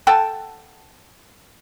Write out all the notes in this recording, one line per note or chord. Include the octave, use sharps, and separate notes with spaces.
A4 F#5 G5 A5